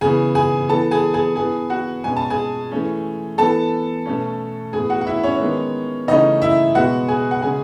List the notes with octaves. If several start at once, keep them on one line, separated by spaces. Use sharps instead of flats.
C#3 E3 B3 G#4 G#5
G#4 G#5
E3 B3 A4 A5
G#4 G#5
G#4 G#5
E3 B3 G#4 G#5
F#4 F#5
B2 G#3 C#4 G#5
A5
G#4 G#5
E3 A3 C#4
E3 B3 A4 A5
B2 A3 C#4
A2 E3 B3 G#4 G#5
F#4 F#5
F#5
E4 E5
C#4 C#5
D#3 G#3 B3
C#3 E3 A3 C#4 D#4 D#5
E4 E5
B2 G#3 B3 F#4 F#5
G#4 G#5
F#5
C#3 G#3 C#4 G#4 G#5